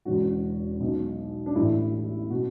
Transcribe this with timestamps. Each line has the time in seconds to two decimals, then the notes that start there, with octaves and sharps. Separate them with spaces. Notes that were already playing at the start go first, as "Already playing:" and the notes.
0.05 E1 E2 C#3 F#4
0.81 B1 B2
1.46 D4
1.55 A1 A2 E3 E4
2.30 B2 F#4